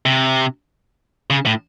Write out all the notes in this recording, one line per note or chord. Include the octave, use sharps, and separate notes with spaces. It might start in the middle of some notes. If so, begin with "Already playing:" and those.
C3
C#3
A2